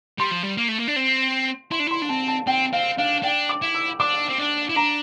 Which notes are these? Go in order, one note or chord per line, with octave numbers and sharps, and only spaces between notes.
G3 C6
F3
G3
A#3
A3
A#3
D4
C4
E4 C6
D4
E4 C6
D4
C4 A5
A5
C4 G5
C4 F5
D4 F5
D4 G5
D6
E4
E6
D4 D6
C4
D4
E4
D4 A#5